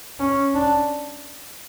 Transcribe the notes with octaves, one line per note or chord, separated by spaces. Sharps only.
C#4
D4